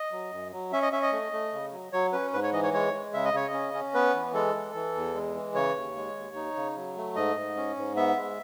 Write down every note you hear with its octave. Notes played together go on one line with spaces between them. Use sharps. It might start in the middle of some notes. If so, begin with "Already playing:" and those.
Already playing: D#5
F#3
F#2
F#3
C#4 E5
D#5
C#4 E5
D#5
A3
A3
C#3
F#3
F#3 C#5
C#4 B4
G#2 B4
C#5
E3 D#5
C#5
G#3 C#5
G#3
C#3 E5
D#5
C#3 C#5
D#5
C#4
C#4
B3 B4
E3
G#3 A4
E3
E3
E2
G#3
E3
C#3 C#5
D#2
G#3
D#2
D#4
C#3
F#3
A3
G#2 D#5
G#2
C#4
G#2
B3 E5
G#3